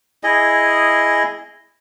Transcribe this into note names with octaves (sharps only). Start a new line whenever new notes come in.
E4 G#4 D#5